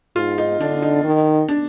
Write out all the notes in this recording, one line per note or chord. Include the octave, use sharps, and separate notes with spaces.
G#2 F4
D#4
D3 D4
D#4
D#3
D4